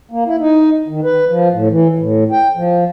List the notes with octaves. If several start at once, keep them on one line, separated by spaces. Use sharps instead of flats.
A#3
E4
D#4
D#3
B4
F3
A2
E3
A2
G5
F3